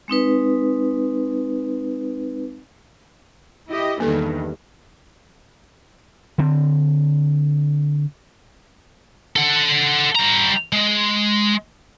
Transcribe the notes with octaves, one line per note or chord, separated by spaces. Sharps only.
G#3 C4 D#4 B4
E4 G4 D#5
E2 G2 D#3 A#3 A4
D3 C4
A4 F#5
G3 A#5
G#3